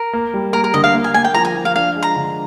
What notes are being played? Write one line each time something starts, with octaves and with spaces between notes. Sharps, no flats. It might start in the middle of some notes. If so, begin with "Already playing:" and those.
Already playing: A#4
A#3
G3
A#3 A#4
A#4
D3 D#5
F5
A#3
G#5
A#3 G#5
G5
F3 A#5
G#5
F3
F5
D4 F5
G#3
A#5
D3